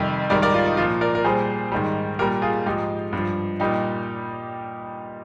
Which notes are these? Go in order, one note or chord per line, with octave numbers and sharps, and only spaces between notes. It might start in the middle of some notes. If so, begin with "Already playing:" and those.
Already playing: F2 C3 D#3 G3
G#2 D#3 G3 A#4 D5
A#4 D5
F4
D#4
A#2 F3 F4
A#4 D5
A#4
A#2 G3 G#4 C5
G#2 D#3 G3
A#2 G3 G4 A#4
F4 G#4
G#2 F3 D#4 G4
G2 F3
A#2 G3 D#4 G4